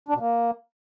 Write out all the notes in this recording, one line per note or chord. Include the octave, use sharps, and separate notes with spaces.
D4
B2
A#3